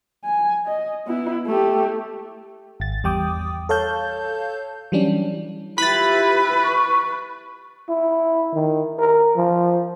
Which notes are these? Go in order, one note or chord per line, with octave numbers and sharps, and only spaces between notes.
G#5
D#5
B3 E4
A3 G4
G#1 A6
E2 G3 G5 D6 D#6
A4 C#5 F5 A5 G6
E3 F#3 G3 C#4 D4
E4 F4 G4 B4 B5 A6
C#6
E4
D#3
A#4
F3